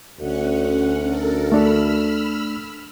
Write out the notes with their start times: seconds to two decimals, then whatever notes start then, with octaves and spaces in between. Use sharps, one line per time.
0.19 D2 C#4 F#5
1.06 A4 A#4
1.52 A3 D4 A4 B5 E6 F6